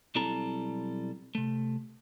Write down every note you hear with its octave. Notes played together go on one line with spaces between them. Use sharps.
B1 G3 C4 E4 A4 A#5
C3 A3